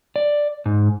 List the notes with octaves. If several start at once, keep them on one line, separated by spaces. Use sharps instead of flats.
D5
G#2